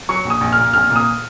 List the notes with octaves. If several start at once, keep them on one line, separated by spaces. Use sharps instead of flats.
F#3 C#6
A#1
D#6
A#1
F6
A#2
A#1 F6
A#2
D#6